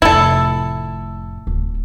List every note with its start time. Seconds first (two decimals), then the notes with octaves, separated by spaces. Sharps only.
0.02 F1 A2 E4 A4
1.47 D1